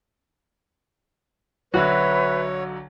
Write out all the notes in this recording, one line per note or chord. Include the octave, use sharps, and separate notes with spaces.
B1 D3 F#3 F#4 B4 C#5 E5